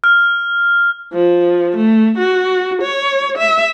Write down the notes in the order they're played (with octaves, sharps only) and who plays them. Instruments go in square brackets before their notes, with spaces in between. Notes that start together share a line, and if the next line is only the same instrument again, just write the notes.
[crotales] F6
[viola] F3
A3
F#4
C#5
E5